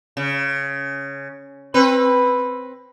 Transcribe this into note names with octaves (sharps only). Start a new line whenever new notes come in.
C#3
C4 B4